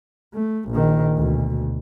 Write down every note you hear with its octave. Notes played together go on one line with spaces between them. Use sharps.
A3
A#1 D#3
D2 B2